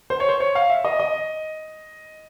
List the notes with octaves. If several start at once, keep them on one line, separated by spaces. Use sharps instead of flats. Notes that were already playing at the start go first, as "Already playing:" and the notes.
C5
C#5
C5
C#5
F5
E5
D#5
D#5